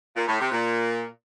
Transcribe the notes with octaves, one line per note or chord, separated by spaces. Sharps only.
A#2
A2
C3
A#2